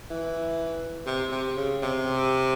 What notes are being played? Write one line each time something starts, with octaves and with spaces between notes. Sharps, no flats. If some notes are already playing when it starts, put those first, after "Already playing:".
E3
C3
C3
C#3
C3